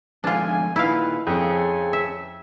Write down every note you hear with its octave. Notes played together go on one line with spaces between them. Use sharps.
F2 G#2 D3 D4 F4 G#5
A#2 D#4 E4 B4 F5
F2 C4 C#4 G#4 A4 G#5
E5